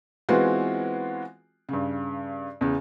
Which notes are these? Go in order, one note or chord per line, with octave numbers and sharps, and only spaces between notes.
E3 G#3 B3 C4 F4 F#4
G2 C#3
E2 C#3